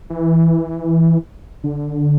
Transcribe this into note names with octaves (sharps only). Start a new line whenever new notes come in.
E3
D3